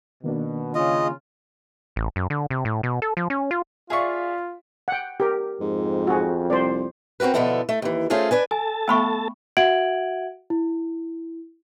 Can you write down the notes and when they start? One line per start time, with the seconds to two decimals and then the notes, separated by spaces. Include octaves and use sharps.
0.24 B2 D#3 A#3 D4
0.75 C#3 F4 D#5
1.96 A1
2.16 F#2
2.30 D3
2.50 C3
2.65 A2
2.83 B2
3.02 A4
3.17 F3
3.30 C#4
3.51 F4
3.90 F4 G#4 D5 E5 F5 C#6
4.88 F#5 G5
5.20 G4 A#4
5.60 F2 G#2
6.07 F#4 G#4
6.50 C2 C5 D5
7.20 C4 F#4 G4 A#4 B4
7.34 B2 D3 F3 B3 E4 A4
7.69 A3
7.82 D#2 E3
8.10 A3 C#4 F4 G#4 A4 C5
8.31 D4 B4 G#5
8.51 A4 G#5 A5
8.88 A3 B3 E5 G5 B5 C#6
9.57 F#4 E5 F#5 G#6 D7 F#7
10.50 E4